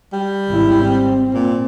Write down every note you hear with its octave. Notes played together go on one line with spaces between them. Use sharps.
G3
G#1 E4
C4
A#2